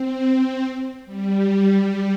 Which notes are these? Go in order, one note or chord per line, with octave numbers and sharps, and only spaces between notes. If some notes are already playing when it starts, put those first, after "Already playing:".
Already playing: C4
C4
G3
G3